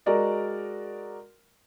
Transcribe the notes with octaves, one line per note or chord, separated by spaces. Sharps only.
G#3 F#4 A#4 D5 D#5